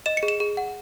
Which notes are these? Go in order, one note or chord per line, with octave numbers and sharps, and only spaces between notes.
D#5 E7
C#7
G#4
E7
G#4
F#5